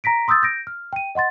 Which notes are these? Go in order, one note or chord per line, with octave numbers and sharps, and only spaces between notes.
A#5 A#6 B6 D7
C6 D#6 E6 G6 A6
G6 A#6 D7
F6
G5 D#7
D#5 F#5 C6 A6